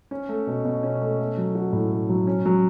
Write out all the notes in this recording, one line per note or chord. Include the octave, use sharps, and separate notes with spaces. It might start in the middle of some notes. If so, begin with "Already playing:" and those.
C#4
A3
B2
B2
C#4
A3
A3
F#3
F#4
A2
A3
F#3
C#4
F#3